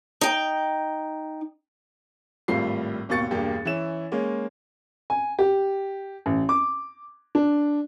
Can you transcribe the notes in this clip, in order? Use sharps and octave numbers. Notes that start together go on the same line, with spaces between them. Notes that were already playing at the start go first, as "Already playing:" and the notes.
D#4 G5
G#1 A2 G3 F4 C7
G#1 D#2 B2 C#6 A6 C#7
E1 G2 A#3 G4
E3 C#4 E4 E7
G#3 A#3 C#4
G#5
G4
A1
D6
D4